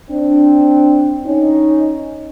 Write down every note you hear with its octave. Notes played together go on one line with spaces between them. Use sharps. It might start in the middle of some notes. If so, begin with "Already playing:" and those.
C4 D4
C#4 D#4